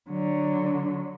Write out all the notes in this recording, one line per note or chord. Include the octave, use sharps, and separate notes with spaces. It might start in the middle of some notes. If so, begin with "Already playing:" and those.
D3 F#3